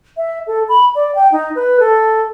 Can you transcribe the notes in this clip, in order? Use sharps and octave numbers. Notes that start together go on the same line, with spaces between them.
E5
A4
B5
D5
G5
D#4
B4
A4